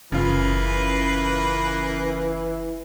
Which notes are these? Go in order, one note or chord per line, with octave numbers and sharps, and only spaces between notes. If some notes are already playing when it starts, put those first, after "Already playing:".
F#1 C#3 E3 A#3 F4 B4